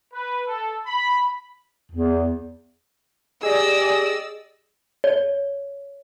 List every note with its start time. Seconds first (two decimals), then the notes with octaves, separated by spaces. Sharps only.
0.13 B4
0.46 A4
0.87 B5
1.92 E2
3.43 G4 G#4 D5 D#5 E6
5.04 C#5